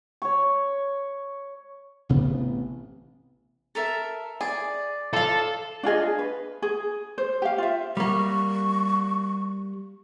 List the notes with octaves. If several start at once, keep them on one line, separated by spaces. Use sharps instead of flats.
C#5 C#6
A1 C3 B3
A4 A#4 E5
G#4 D5
F3 A4 F5
D4 F4 G#4 D#5
B4
G#4
C5
G4 F5
F4 E5
G3 A#3 C#6